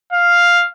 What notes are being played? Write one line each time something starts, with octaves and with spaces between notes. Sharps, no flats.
F5